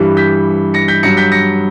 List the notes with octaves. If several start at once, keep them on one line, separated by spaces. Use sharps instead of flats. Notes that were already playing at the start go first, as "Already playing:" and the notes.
Already playing: G2 E3 G3
G6 B6
A#6 C#7
G6 B6
G2 F#3 A#6 C#7
G6 B6
A#6 C#7